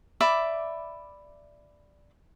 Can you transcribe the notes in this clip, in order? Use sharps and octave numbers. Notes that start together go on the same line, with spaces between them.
D5 E5 B5 D6